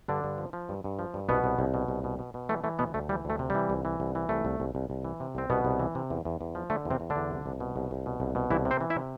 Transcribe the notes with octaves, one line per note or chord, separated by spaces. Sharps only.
G2 D3 D4
G2
F3
F3
G2
G2
F3
G2
C2 B2 B3
C2
C2
B2
C2
B2
B2
B2
E3 A3
E3 A3
D2 B2 B3
D2 A3
E3 G3
D2 A3
C3
E3 G3
C2
E3
C2
E3
C2 A3
C2
C2
C2
C2
E3
C3
C2 C4
C2 B2 B3
C2
E3
C3
E2
E2
E2
F3
D3 A3
E2
C3 C4
E2
D3 D4
E2
C2
C2
B2
C2
C2
B2
C2
B2
C2 E3 E4
C3
C4 C5
E3
E4 E5
C3